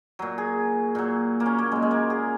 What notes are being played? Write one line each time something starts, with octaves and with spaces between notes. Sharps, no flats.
A#2 F#3
G#4
A#2 F#3
A#3
C#4
A#3
A#2 F#3 G#3
G#3
A#3
G#4